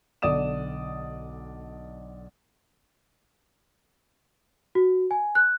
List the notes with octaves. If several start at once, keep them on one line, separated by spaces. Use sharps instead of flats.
B1 D3 D5 D#6 E7
F#4
G#5
F#6